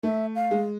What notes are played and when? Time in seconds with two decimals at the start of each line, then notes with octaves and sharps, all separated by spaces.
0.03 A3 E5
0.36 F5
0.51 G#3